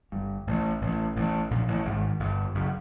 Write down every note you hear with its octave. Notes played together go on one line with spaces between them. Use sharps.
G1 G2
A1 A2
A1 A2
A1 A2
A#1 A#2
A1 A2
G#1 G#2
G1 G2
F#1 F#2